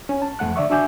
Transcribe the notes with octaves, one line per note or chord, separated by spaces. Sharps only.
C#4
A5
F2 A3 F#5 F#6
D3 D5 E5 C#6
D4 F#4 E5 G#5 D6 G6